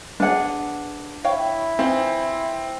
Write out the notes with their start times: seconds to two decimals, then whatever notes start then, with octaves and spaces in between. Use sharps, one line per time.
0.20 B3 D4 G#4 F#5
1.25 E4 C#5 F5 G5
1.79 E3 C4 D#4 F4